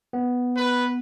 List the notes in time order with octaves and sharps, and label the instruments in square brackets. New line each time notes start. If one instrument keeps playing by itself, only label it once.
[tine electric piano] B3
[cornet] B4